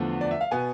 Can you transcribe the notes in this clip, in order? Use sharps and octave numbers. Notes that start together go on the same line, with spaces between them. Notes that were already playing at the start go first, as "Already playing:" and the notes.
Already playing: E2 D3 F3 A3
D5
E5
F5
B2 B3 G#5